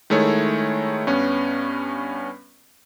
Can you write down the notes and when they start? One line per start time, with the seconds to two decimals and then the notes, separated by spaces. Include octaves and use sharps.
0.10 D#3 G#3 A3 E4 C#5
1.07 G2 B3 C#4